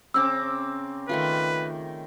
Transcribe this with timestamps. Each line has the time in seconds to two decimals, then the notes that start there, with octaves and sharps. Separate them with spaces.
0.14 C#3 C4 D6 E6
1.09 D#3 A3 F4 B4